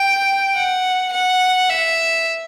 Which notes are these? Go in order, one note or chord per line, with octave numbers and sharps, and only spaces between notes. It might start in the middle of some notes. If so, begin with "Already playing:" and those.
Already playing: G5
F#5
F#5
E5